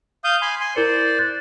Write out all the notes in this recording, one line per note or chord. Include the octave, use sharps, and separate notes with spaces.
F5 D#6 G6
G#5 B5 C6
G#5 C6
E4 A#4 C5 D5 C#7
F#6 G6 A6